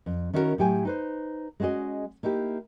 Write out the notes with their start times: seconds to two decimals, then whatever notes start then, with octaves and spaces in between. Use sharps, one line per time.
0.06 F2
0.33 D#3 C#4 E4 F#4 G#4 A#4
0.58 A2 F#3 G4 G5 G#5
0.85 D#4 B4 C5
1.60 G#3 C#4 F#4 G#4 D#5
2.23 A#3 D#4 E4 G4